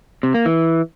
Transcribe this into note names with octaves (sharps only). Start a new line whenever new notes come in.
C3
A#3
E3